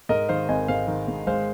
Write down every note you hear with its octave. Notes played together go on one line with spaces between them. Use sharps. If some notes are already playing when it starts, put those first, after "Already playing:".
G#2 A#4 D#5
D#3 C5 F5
G#1 D#5 G#5
G#2 C5 F5
D#3
G#2
G#3 C5 F5